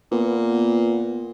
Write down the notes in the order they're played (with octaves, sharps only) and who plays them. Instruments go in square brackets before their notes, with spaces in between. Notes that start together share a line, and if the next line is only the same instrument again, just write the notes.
[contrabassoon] A#2 [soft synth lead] B3